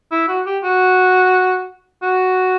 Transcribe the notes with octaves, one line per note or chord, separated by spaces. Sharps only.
E4
F#4
G4
F#4
F#4